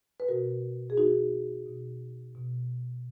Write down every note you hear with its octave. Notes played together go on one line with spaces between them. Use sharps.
B4
B2 F#4 A#4
G#4
B2 D#4 F#4
B2
B2